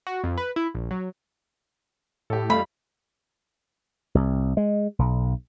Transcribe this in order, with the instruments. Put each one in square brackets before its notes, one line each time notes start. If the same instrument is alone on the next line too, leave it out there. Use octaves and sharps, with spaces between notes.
[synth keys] F#4
F2
B4
E4
A#1
F#3
[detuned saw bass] A2 [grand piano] G4 A4
[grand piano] F2 G3 F5 [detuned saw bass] A3 [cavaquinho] B5
[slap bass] C2
G#3
B1